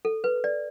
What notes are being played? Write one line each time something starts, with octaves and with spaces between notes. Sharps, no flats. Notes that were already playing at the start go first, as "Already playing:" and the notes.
A4
B4
D5